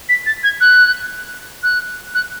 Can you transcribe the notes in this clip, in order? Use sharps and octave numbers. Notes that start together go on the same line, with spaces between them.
B6
A6
G#6
F#6
F#6
F#6